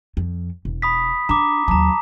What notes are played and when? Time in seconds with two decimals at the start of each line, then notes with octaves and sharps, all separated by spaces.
0.17 F2
0.65 E1
0.82 B5 D#6 B6
1.29 D4 A#5 D6
1.68 D#2 F#3 A5 A#5